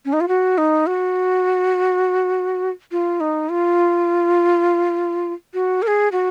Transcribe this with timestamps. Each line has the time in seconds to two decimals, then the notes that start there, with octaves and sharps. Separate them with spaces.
0.05 C#4
0.13 D#4
0.21 F4
0.28 F#4
0.58 D#4
0.87 F#4
2.92 F4
3.20 D#4
3.49 F4
5.54 F#4
5.82 A#4
5.87 G#4
6.12 F#4